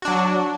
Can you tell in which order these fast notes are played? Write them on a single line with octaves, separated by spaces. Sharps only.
F#4 D4 F#3